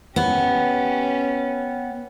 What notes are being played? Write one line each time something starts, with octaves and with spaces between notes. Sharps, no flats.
B3 C#4 G4